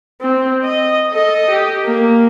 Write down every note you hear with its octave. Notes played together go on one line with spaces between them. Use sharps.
C4
D#5
A4 D#5
G4
A#3